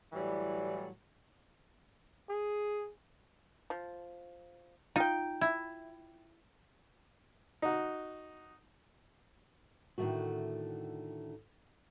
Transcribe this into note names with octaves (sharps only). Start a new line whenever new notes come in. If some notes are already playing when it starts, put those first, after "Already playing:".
A2 E3 F#3 G3
G#4
F3
D#4 F4 G5
E4
D#4 F#4
A2 D3 D#3 A3 F#4